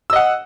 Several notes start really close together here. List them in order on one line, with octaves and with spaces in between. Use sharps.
E6 D#5 F#5